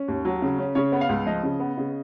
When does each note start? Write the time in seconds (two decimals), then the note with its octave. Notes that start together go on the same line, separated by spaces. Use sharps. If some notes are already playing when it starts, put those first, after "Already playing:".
Already playing: C#4
0.08 D#2
0.25 F#3
0.42 C#3
0.58 C#4
0.75 C#3 C#5
0.92 B3
1.01 F5
1.09 C#2
1.26 F3 D#5
1.43 C#3
1.60 B3
1.78 C#3